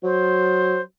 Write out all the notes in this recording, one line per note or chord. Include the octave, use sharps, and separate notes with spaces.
F#3 C5